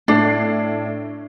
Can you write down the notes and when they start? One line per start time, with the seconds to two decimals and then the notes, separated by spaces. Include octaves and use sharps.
0.08 A2 D4 C7